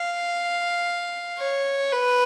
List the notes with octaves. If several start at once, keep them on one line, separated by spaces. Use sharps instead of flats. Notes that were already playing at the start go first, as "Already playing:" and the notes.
Already playing: F5
C#5
B4